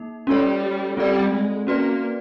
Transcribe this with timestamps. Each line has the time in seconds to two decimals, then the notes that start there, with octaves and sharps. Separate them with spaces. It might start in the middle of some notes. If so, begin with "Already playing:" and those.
Already playing: A#3 D#4
0.27 G3 C#4 F4 A4 C#5
0.97 G3 C4 F4 A4 D5
1.33 G#3
1.67 A#3 C#4 F#4 B4 D5